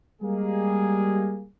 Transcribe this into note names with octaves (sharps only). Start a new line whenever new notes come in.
G3 G#3 A#3 G#4